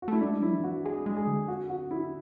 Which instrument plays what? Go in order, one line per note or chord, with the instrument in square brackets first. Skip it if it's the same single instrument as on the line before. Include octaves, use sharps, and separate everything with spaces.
[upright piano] F#4
[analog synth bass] A3 [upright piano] E4
[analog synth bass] G#3 [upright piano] D4
[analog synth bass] F#3 [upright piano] E4
[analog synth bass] E3
[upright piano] F#4
[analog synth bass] G#3 [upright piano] G#4
[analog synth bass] G#3
[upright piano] G#4
[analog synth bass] D3
[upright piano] F#4
F#4
E4